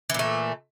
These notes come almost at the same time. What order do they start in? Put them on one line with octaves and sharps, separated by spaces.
E3 A#2 A3